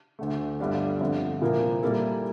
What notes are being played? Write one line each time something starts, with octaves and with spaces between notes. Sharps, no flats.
D2 D3 A3
G1 G2 D3 G3 D4
G1 F2 D3
C2 A#2 F3 A#3 E4
A#2 G3 A#3 E4 A4